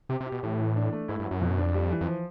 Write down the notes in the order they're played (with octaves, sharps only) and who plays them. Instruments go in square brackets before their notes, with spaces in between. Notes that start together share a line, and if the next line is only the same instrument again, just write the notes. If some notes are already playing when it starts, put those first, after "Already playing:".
[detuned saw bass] C3 [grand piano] G4
[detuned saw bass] C3
[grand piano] G4
[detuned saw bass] B2
[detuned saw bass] A2 [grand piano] E3
[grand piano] E3
D4
A3
[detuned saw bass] G#2 [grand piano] E4
[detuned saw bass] G2
[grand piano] F#3
[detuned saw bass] F#2
[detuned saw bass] F2 [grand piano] B2
[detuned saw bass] F#2
[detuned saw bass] F2 [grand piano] D4
[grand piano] G3
E3
[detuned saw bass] F2
[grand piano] F3